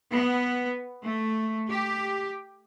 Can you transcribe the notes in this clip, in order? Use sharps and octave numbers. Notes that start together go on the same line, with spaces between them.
B3
A3
G4